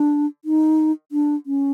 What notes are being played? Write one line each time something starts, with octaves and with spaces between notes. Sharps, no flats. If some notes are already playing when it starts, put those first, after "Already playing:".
Already playing: D4
D#4
D4
C#4